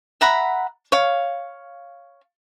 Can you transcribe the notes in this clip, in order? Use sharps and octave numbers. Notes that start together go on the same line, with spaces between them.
E5 F#5 A#5 B5
C#5 F5